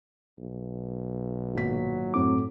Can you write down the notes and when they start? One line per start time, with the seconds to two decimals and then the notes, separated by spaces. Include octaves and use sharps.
0.39 B1
1.55 G#1 A#2 F#3 B6
2.14 F#2 A2 C4 D6